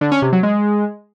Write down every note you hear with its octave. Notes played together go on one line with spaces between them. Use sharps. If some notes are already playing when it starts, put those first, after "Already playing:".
D3
C#4
C3
F#3
G#3